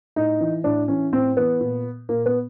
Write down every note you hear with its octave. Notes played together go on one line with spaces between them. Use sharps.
A2 D#4
E3
A2 D4
E3 C#4
A2 C4
E3 B3
A#2
A#2 A#3
B3